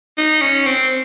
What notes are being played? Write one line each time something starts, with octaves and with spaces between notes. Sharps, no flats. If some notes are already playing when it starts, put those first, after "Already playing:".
D#4
C#4
C4